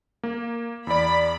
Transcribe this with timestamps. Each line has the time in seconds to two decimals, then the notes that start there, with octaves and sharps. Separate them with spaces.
0.23 A#3
0.87 E2 D5 B5